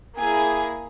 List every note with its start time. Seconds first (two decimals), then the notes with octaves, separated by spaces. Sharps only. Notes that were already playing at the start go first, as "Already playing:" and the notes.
0.17 A#3 E4 G#4 G#5